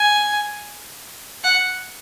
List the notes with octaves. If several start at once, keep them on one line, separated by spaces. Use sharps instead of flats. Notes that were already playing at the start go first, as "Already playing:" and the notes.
Already playing: G#5
F#5